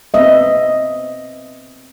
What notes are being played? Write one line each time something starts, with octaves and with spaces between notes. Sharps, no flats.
B3 C4 D#5 E5